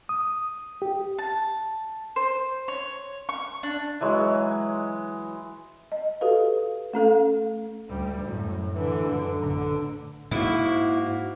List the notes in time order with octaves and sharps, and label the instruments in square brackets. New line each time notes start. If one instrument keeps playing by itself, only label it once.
[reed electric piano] D#6
G4
[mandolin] A5
C5
C#5
C#6
D4
[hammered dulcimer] E3 F#3 G#3
[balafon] D#5
F#4 G4 A4 B4 F5
A3 C#4 A4 F5
[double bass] D2 G3
F#2 A2
D3 E3
F#2 D3
A1 D3
[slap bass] G#2 [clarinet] A#3 [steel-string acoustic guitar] E4 [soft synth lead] F#4